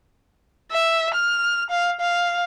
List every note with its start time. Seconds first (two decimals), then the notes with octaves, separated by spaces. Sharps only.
0.72 E5
1.14 F6
1.70 F5
2.00 F5